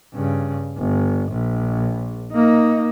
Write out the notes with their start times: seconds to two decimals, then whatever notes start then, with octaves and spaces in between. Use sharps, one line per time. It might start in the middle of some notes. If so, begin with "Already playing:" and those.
0.14 G2 C#3
0.78 G1
1.32 A#1
2.33 A#3 D#4